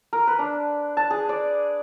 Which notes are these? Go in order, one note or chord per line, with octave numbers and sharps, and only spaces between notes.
A#4
B4
D4
A5
G#4
D5